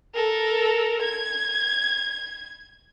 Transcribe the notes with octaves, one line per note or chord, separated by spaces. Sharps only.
A4 A#4
G#6